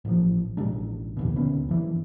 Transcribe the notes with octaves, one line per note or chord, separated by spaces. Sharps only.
A1 F3
A1 B2 G#3 D4
F1 D#2 B2
D2 B3 C#4
G2 E3